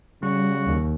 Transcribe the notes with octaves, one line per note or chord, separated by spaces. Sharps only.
C#3 G3 F#4
D#2